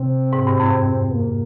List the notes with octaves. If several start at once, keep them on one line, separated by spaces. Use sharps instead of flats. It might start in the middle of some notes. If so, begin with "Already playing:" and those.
Already playing: C3 C4
G#2
G2
F2
A#3